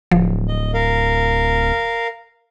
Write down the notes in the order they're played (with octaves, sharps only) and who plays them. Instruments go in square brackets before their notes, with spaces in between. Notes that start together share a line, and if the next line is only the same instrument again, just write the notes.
[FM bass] D1 [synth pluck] F3
[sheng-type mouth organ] D#5
A#4 F5